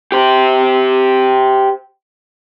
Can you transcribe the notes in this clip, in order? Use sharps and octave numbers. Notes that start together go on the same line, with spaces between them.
G4 C5